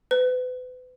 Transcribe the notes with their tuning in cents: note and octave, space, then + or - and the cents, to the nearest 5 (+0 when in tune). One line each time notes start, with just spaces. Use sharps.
B4 +35